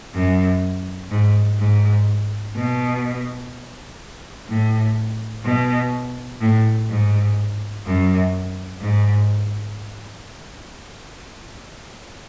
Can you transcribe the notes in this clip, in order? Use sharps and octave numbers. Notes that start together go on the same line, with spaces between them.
F#2
G#2
G#2
B2
A2
B2
A2
G#2
F#2
G#2